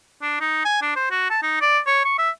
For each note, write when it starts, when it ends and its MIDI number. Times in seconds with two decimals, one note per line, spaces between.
0.22 0.37 62
0.40 0.62 63
0.65 0.80 80
0.81 0.92 62
0.96 1.08 72
1.11 1.27 66
1.30 1.39 81
1.43 1.57 63
1.61 1.79 74
1.86 2.02 73
2.05 2.16 85
2.18 2.30 76